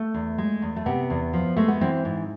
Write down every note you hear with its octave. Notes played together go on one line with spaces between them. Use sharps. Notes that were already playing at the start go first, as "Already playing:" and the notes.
Already playing: A3
E2
G#3
E2
A3
C3 B3
E2
F3
G#3 A3
B3
E3 C4
G#2